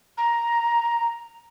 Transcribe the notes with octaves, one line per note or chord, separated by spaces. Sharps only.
A#5